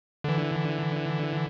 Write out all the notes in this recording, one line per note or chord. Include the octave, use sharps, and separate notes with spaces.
D3 E3